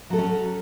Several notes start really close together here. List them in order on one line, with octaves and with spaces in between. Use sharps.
F#3 A4 F#4 C#4